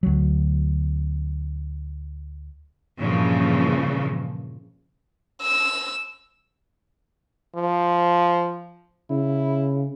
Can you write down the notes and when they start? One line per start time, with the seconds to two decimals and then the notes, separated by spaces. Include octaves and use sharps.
0.03 D2 F#3
2.99 G2 A#2 C#3 E3 F3
5.42 E6
7.55 F3
9.10 C#3 E4